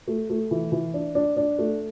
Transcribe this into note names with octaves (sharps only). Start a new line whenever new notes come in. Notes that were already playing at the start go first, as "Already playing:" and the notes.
A3
A3
E3
E3
D4
D4
D4
A3